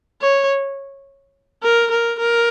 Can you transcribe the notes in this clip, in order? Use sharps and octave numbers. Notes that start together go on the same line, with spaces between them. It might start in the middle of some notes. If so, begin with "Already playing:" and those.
C#5
A#4
A#4
A#4